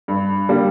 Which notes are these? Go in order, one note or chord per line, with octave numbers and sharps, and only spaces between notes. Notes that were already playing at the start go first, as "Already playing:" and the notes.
G2
D3 G3 A#3